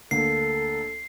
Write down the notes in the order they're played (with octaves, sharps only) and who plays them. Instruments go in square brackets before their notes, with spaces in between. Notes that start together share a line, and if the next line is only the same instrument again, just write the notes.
[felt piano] D2 A#3 [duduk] A4 [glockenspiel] C7